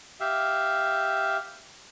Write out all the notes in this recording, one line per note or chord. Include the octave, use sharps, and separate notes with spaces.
G4 E5 F5